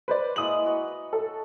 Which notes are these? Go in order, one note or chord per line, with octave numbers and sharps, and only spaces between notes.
B4 C5 D5
G#3 A#3 E4 D#6 F#7
F#4 B4 D#5
A4